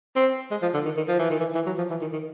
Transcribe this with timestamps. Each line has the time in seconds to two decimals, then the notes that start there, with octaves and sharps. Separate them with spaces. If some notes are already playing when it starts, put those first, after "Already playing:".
0.16 C4
0.51 G#3
0.62 F3
0.74 D3
0.85 D#3
0.97 D#3
1.08 F3
1.19 E3
1.30 D#3
1.40 E3
1.55 E3
1.66 F#3
1.78 F3
1.90 E3
2.01 D#3
2.13 D#3